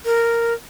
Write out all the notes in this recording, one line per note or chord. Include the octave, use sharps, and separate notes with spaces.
A#4